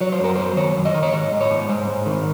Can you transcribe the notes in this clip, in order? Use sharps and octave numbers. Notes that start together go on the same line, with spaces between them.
F#3 C#5
C5
F#2 A#4
F#3 C5
D#3 C#5
F#2
D#5
D#3
C#5
G#2 D#5
G#2
C#5
G#2
G#3 C5
G#2
D#3